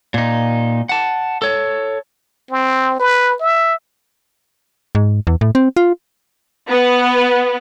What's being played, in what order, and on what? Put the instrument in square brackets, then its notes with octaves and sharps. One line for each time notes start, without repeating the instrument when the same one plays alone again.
[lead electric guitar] A#2 D#4
F#5 A5
A4 C#5
[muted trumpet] C4
B4
E5
[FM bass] G#2
E2
A2
C4
F4
[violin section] B3